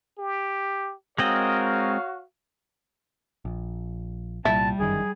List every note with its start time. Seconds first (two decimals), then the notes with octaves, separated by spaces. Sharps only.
0.18 G4
1.18 G#3 C4 F#4 A#4 C#5 D#5 F5
3.45 A#1
4.45 C2 A#2 G3 E4 A5
4.80 G1 F#2 D#3 G#4